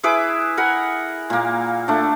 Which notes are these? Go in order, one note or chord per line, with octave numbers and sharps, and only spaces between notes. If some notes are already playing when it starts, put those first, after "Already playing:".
E4 G#4 B4 D6
A#4 F#5 G#5 B5
A#2 A#3
A3 D4